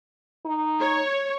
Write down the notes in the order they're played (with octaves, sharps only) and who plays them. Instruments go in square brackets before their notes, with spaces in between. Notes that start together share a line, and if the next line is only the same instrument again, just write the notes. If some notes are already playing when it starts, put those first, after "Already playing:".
[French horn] D#4
[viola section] C#5